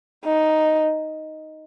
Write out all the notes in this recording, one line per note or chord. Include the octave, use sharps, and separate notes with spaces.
D#4